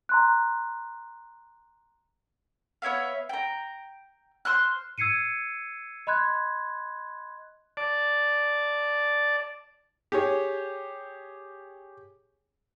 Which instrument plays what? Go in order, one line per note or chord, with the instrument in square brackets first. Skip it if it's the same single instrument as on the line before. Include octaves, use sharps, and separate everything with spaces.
[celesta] A#5 C6 F#6
[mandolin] B3 C#5 E5 F5
G5 A#5
C5 C6 F6 F#6
[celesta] E6 G#6 C7 C#7 D#7
D#5 B5 C6 F#6 G#6
[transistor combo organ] D5 A5
[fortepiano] G4 G#4 C#5